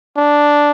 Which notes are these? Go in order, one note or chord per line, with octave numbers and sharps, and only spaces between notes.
D4